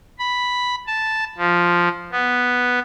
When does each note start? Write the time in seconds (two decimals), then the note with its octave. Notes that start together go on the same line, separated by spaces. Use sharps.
0.19 B5
0.87 A5
1.38 F3
2.12 B3